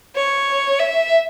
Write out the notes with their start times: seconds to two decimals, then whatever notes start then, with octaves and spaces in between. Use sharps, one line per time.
0.16 C#5
0.79 E5